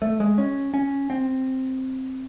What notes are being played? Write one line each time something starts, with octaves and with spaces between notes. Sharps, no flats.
A3
G#3
C#4
C#4
C4